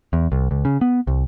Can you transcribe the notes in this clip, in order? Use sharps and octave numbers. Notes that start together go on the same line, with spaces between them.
E2
C2
C#2
C#3
B3
C2